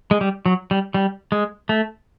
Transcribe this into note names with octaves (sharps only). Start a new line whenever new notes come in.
G#3
G3
F#3
G3
G3
G#3
A3